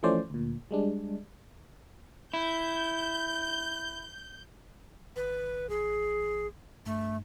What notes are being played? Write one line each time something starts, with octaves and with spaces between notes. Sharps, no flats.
E3 F3 A3 C#4 C5 D5
D2 A#2
G3 G#3 D4
E4 G6
G#1 B4
A1 G#4
G2 A3